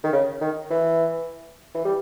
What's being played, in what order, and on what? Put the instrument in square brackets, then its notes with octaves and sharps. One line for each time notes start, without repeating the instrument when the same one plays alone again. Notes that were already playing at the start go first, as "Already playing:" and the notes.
[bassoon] D#3
C#3
D#3
E3
E3
G3